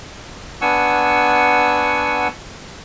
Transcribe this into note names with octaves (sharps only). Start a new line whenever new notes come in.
B3 D4 F#5 G#5 C#6 E6